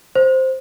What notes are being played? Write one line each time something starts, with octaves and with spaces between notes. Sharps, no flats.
C5